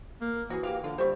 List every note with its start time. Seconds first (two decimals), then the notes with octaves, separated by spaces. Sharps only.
0.21 A#3
0.50 E3 F#4 G#4
0.63 A#3 G4 F5
0.84 D3 F4
0.98 G3 C5 E5 C#6